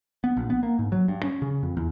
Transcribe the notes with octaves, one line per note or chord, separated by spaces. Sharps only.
B3
A#1
B3
A#3
G#2
F#3
G2
C#4
C#3
F2
E2